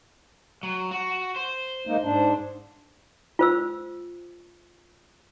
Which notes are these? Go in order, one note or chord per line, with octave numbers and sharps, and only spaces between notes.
F#3
F#4
C5
G#3 A#3 D#4
G#2 D4
F4 C5 E6